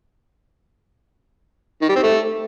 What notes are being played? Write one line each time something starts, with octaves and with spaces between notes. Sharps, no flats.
D#3
G3
C4
A3